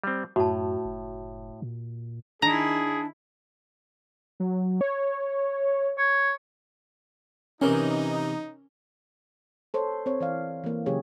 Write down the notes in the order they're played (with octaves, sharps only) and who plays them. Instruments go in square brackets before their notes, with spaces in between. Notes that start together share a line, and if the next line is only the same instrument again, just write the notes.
[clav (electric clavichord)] G3 C4
[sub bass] F#2 [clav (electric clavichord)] A2 [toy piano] F#4 A5
[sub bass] F#1
A#2
[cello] D#3 E4 [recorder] D4 [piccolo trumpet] G#4 [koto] A#5
[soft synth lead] F#3
C#5
[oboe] C#5
[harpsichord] C3 E3 [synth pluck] C#4 A#4 [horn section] D#4
[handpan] A4 C5 C#5
C4 C#5
E3 D5 F5
E3 A#3
C#3 F#3 G4 G#4 C#5